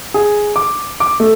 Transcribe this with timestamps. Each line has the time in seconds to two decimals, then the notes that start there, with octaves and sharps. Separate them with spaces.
0.14 G#4
0.56 D6
1.00 D6
1.20 A3